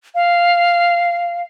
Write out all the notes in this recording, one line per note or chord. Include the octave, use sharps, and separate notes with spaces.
F5